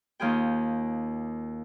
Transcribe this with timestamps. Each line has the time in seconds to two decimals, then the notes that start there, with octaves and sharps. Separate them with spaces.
0.20 D#2 F4 G#4 G5